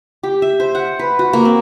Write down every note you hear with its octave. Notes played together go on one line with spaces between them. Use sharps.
G4
E5
C5
F#5
B4
F#4
A#3
C4